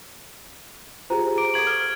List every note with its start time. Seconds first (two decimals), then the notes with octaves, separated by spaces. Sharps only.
1.10 F4 G4 G#4 C5 A#5
1.38 D6 D7
1.54 A4 F#5 C#6 G#6 F#7
1.67 F6